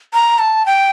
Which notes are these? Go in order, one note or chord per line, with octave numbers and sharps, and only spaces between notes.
A#5
A5
G5